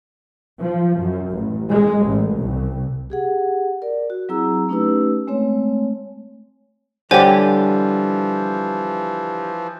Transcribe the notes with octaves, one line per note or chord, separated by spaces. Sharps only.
F3
F#2
A1
G#3
A1
C2
G4 G#4 F#5
A#4 D5
F#4
F#3 C4 E4 G#4 A#5 E6
A3 C#4 D#4 G4 B4 E6
G#3 A3 C4 C#5
D3 E3 F3 G3 G4 C5 C#5 G#5